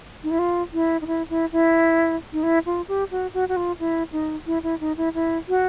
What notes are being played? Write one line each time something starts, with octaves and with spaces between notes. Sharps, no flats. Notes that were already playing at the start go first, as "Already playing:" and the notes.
D#4
E4
F4
E4
D#4
E4
E4
E4
D#4
E4
F4
G4
F#4
F#4
F#4
F4
E4
D#4
E4
E4
D#4
E4
E4
F#4